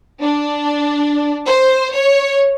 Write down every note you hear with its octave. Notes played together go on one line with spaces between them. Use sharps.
D4
C5
C#5